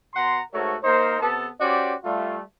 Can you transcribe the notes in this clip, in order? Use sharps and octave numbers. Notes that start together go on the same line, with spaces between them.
B2 F#5 A#5 C6
G#2 A3 F#4 A4 A#4 C#5
A#3 D#4 A#4 C5
C3 B3 A4 A5
C#4 F#4 G4 C5 D5
G3 A3 F4